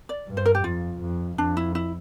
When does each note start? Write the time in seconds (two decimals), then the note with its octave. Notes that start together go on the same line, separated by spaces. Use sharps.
0.09 D5
0.27 G2
0.37 C5
0.46 A#4
0.55 G4
0.64 F2 F4
1.01 F2
1.38 F2 D4
1.57 E4
1.75 E4